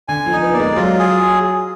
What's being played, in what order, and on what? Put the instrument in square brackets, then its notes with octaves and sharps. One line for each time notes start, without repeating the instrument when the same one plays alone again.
[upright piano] D3 [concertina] G#5
[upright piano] F3
[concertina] D#4
[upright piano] B3
[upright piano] A#3 [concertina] D5
[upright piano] G#3
[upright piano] F#3 [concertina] F4
[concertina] G#4